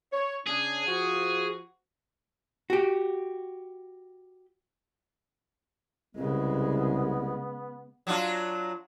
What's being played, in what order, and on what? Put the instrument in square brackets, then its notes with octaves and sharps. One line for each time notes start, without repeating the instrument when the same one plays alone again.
[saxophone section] C#5
[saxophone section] C#3 D4 [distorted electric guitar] G#4
[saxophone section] F3 F#4
[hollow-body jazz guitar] F#4 G4
[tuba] C2 [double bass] C#3 G#3 [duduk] B3
[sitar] F#3 D4 F4